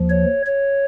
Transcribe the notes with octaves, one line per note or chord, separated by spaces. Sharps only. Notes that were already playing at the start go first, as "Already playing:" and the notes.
Already playing: D#2 F3
C#5
C#5